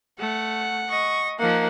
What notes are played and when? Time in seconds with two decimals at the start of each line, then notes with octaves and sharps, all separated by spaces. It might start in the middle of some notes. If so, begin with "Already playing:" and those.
0.19 A3 F#5
0.89 D#5 C#6
1.39 F3 A#3 D#4 F#5